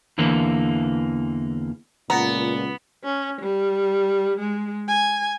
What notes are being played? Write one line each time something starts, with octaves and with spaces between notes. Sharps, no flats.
E2 D3 E3 A#3
C#2 A#2 B3 A#5
C#4
G3
G#3
G#5